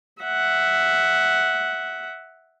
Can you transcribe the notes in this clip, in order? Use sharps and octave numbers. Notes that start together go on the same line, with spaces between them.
E5 F#5